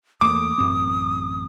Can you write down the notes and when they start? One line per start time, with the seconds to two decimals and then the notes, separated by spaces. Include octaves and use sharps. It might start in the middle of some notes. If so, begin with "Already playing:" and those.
0.21 E2 A3 A#3 D6 D#6
0.58 A1 F#2 C4